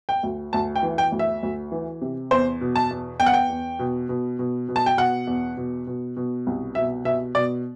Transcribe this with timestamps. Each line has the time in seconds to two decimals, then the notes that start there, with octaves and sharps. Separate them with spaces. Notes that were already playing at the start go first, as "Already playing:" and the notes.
0.09 G5
0.23 D2
0.53 D2 A5
0.76 G5
0.83 E3
0.98 G5
1.12 D2
1.19 E5
1.43 D2
1.72 E3
2.02 C3
2.31 E2 C5
2.61 B2
2.76 A5
2.90 E2
3.19 E2 G5
3.26 F#5
3.33 G5
3.50 E2
3.79 B2
4.09 B2
4.39 B2
4.68 B2
4.76 A5
4.86 G5
4.97 B2 F#5
5.27 E2
5.57 B2
5.87 B2
6.17 B2
6.47 C2
6.75 B2 E5
7.05 B2 E5
7.35 B2 D5